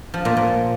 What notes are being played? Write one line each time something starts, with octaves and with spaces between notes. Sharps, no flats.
F3
A#2
A#2